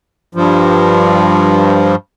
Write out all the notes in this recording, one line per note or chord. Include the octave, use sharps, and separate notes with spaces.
G2 F3